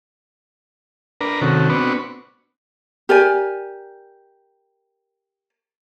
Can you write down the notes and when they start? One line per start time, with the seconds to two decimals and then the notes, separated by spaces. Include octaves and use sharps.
1.21 D4 A#4 B4 A#5
1.42 C3 D#3 C#4 F#4 A4
1.69 B3 C4 D4 F#4 B4 C#6
3.09 G4 A#4 D5 G#5